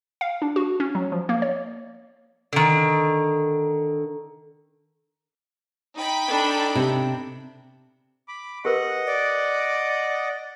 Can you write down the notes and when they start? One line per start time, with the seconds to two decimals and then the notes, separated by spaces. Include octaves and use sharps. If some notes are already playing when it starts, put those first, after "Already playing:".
0.21 F5
0.42 D4
0.56 F#4
0.80 C#4
0.95 F#3
1.12 F3
1.29 A#3
1.42 C#5
2.53 D3 D#3
5.95 D#4 G5 B5
6.28 D4 A4
6.75 C3
8.28 B5 D6
8.65 G4 A#4 B4 D#5 F#5
9.07 D5